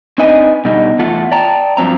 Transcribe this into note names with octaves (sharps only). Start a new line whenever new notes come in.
C4 D4 D#4 B4 D#5 G#5
B2 D3 G3 D#4
E2 A3 F4 F#5
D5 G5 A5 A#5
G2 F3 F#3 C4 A#5